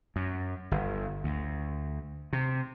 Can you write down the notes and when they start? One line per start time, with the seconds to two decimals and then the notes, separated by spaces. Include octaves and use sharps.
0.16 F#2
0.71 G1
1.24 D2
2.33 C3